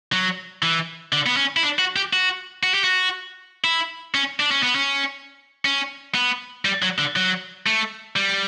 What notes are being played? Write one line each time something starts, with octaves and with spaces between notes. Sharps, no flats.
F#3
E3
D3
B3
C#4
E4
D4
F#4
G4
F#4
F#4
G4
F#4
E4
C#4
D4
C#4
B3
C#4
C#4
B3
G3
F#3
D3
F#3
A3
G3